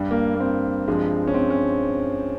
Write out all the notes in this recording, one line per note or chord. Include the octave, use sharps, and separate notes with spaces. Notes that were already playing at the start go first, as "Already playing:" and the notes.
Already playing: G2 G3
A#3
A#3
C4
G2 F3 G#3
C#4
C4
C#4